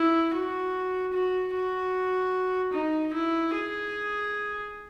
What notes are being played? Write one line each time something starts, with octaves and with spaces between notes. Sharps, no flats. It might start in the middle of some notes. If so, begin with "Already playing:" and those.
Already playing: E4
F#4
F#4
F#4
D#4
E4
G#4